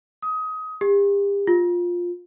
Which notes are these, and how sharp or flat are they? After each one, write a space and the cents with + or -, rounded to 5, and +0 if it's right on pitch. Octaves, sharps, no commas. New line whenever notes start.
D#6 +20
G4 +40
F4 +10